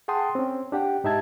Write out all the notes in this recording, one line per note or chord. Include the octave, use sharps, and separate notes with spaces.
G#4 F#5 G5 A5 C6 D#6
C4 C#4
D4 G4 F#5 G5
G#2 D#4 G4 E5 A5 G#6